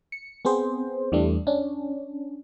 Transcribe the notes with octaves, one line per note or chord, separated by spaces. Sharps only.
C#7
B3 C4 G#4 C5
E2 E3 G3 A3 D4
C#4 D4